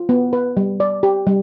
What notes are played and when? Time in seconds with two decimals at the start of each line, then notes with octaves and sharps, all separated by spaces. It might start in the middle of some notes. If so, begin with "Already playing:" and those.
Already playing: F4
0.09 B3
0.33 B4
0.57 G3
0.80 D5
1.03 G4
1.27 G3